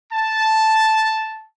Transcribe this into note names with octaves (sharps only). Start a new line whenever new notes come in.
A5